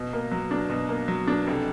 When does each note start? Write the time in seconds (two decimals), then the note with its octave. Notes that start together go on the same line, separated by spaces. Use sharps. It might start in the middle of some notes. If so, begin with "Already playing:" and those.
Already playing: B2
0.13 A#3
0.31 F#3
0.51 D4
0.69 B2
0.89 A#3
1.08 F#3
1.27 D4
1.47 F1